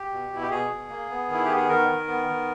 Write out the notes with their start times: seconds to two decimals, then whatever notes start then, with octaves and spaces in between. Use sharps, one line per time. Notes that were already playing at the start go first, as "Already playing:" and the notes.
Already playing: G4
0.11 B2
0.30 B2 E4
0.42 G4
0.50 B2 G#4
0.70 B2
0.89 A#3
1.10 B3
1.29 D#3 E4
1.45 B3 G4
1.57 G#4
1.69 D#3 A#4
1.89 D#3
2.08 B3
2.27 D#3